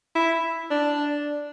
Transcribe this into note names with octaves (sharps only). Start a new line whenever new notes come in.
E4
D4